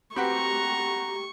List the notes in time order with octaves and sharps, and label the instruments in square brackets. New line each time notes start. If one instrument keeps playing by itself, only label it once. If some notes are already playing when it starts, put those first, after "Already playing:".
[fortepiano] C4 F#4 B4 [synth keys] G4 [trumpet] A#5 [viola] C#6